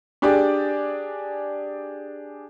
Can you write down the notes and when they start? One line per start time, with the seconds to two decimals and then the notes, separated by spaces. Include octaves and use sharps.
0.22 D4 G4 G#4 D5